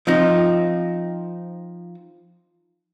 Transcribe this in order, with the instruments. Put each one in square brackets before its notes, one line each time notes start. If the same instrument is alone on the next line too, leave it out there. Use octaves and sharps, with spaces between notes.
[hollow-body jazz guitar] F3 C4 D#4